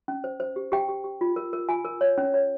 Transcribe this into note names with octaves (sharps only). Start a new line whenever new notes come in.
C#4
C5
C5
G4
G4 G5
G4
G4
F4
A#4
A#4
F4 G#5
A#4
C#5
C#4
C#5